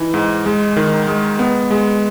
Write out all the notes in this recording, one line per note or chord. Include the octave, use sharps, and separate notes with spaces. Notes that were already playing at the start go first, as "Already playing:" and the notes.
Already playing: E3 D#4
G#2
G#3
D#3
G#3
B3
G#3